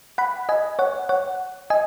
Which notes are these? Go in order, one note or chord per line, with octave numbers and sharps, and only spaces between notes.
F#5 B5
D#5 G#5
C#5 F#5
C#5 F#5
D#5 G#5